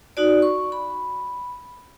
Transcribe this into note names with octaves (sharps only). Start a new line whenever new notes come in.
D#4 F#4 D5
C#6
B5